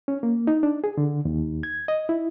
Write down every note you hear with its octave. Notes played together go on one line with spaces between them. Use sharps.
C#4
A#3
D#4
D4
G#4
D3
D#2
G#6
D#5
E4